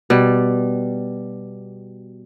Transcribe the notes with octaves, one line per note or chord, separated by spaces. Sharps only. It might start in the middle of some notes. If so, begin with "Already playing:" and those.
B2 G3